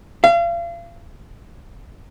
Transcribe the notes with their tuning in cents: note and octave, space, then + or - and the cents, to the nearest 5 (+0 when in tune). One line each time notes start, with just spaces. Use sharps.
F5 -35